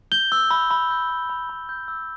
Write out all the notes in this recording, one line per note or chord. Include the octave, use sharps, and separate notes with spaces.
G6 G7
E6
B5
B5
G6
E6
B5
B5
G6
E6